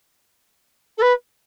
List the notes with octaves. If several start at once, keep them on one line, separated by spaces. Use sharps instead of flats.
A4
B4